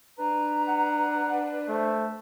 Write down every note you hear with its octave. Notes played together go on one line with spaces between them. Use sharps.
D4 B4 A#5
F#5
A3 C5